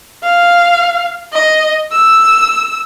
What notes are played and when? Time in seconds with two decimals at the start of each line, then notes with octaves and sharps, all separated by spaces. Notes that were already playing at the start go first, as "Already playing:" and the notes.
0.23 F5
1.33 D#5
1.93 E6